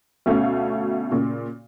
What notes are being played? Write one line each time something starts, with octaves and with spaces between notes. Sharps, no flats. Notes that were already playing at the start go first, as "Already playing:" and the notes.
D2 B2 A3 C#4 F5
A#2 C#3